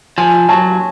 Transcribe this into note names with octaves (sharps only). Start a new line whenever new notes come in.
F3 G#5
F#3 A5